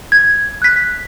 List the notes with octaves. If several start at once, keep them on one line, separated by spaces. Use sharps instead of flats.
G#6
F#6 B6